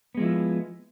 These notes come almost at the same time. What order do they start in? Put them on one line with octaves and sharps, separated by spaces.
B3 G#3 F3 E4